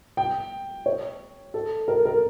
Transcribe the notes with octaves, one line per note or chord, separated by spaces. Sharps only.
G5
C#5
A4
A#4
A#4